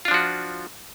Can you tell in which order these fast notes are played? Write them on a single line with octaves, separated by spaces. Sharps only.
F4 D4 F3 F#4